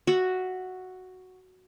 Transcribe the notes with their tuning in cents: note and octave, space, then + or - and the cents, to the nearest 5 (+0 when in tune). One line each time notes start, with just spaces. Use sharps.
F#4 +0 E5 +10